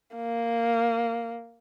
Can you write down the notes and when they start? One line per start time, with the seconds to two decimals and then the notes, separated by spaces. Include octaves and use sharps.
0.16 A#3